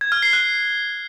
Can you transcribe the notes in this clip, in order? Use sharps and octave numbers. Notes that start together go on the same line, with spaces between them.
G#6
F6
C7
F#6